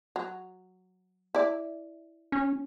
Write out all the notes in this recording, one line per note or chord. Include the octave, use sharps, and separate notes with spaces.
F#3
E4 D5
C#4